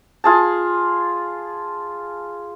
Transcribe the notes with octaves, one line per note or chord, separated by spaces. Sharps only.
F4 G#4 A5